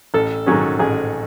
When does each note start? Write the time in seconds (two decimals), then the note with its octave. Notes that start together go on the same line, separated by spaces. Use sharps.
0.14 A1 A4
0.46 G#2 D#3 F#3 C#4 G#4
0.79 A1 G#4